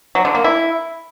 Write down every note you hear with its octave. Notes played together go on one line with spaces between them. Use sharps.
F#3
D3
A#3
E4